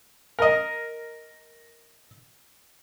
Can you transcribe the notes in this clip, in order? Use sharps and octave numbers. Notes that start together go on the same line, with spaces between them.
A#4 D#5